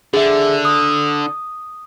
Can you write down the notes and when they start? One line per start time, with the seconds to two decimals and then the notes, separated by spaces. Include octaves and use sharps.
0.14 D3 G#4 E5
0.65 D#6